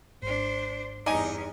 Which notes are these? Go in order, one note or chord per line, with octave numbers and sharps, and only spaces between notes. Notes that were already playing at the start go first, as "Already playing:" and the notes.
G#1 G#2 D4 C5
E2 G2 D#4 D5 G#5